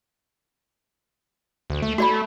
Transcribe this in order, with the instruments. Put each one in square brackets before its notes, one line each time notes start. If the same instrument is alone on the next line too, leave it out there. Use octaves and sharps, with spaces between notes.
[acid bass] D2
A3
[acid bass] A3 [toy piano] F#4 D5 B5